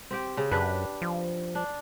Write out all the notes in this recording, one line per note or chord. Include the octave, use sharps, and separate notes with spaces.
C4 G4 G5
C#3
F#2 D4 G4 B4
F3
D4